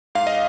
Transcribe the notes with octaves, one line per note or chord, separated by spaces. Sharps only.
G#2 F5
D#5